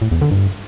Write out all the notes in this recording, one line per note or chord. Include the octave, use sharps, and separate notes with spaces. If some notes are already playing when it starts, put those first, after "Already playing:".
A2
E2
D3
G2